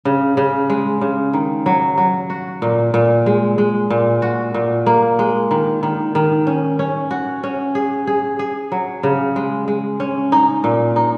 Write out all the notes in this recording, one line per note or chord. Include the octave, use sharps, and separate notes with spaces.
C#3
C#3
G#3
C#3
D#3
F#3
F#3
F#4
A#2
A#2
G#3
G#3
A#2
F#4
A#2
A#3
G#3
D#3
D#3
D#3
C#4
C#4
F#4
C#4
G#4
G#4
G#4
F#3
C#3
G#3
G#3
C#4
D#4
A#2
D#4